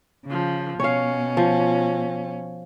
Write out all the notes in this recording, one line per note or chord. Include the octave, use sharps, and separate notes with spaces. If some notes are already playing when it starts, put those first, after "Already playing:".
C#3 F3
B2 C#4 C#5 F5
F3